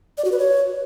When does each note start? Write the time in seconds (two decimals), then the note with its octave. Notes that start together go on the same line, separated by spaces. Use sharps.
0.18 D5
0.25 F#4
0.32 B4
0.39 C#5